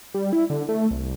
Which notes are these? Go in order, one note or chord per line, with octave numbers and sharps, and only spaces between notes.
G3
E4
D3
A3
C2